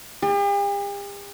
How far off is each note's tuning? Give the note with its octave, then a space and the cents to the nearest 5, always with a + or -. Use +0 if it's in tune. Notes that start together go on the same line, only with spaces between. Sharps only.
G4 +45